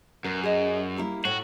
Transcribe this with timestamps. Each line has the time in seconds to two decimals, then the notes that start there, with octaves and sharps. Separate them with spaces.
0.25 F#2 B2 A#4
0.43 G#4 D#5
0.97 G3 A#3 E4
1.25 A2 F#4 C#5 G5